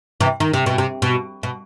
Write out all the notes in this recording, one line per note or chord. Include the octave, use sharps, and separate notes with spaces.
C3 E3
D#3
C3
B2
C3
B2
B2